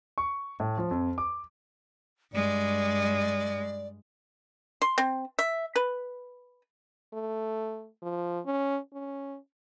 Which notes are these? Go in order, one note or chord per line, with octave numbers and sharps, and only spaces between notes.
C#6
A2
F3
F2
D6
G2 G#3 D5
C6
C4
E5
B4
A3
F3
C#4
C#4